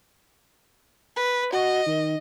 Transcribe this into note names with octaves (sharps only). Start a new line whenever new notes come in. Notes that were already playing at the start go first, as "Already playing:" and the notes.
B4
F#4 D#5
D#3